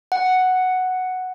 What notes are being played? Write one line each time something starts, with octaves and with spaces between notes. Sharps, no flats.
F#5